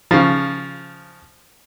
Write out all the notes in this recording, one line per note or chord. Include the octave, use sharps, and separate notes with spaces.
C#3 F3